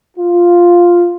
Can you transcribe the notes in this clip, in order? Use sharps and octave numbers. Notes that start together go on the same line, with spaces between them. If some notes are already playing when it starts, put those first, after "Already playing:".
F4